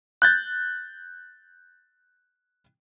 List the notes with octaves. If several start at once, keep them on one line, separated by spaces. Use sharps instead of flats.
F#6 G6 A6